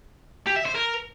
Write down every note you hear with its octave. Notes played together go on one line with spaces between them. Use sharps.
G4
E5
C5
A#4